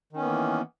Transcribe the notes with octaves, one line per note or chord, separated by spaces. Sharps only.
D#3 E3 A#3 B3 C#4